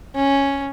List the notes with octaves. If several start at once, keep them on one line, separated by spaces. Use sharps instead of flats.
C#4